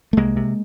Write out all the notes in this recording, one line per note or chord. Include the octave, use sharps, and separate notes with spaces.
A3
C2 G#3 A#3
C3